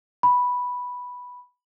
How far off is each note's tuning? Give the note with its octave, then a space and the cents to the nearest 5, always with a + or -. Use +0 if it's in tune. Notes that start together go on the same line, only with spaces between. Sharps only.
B5 -5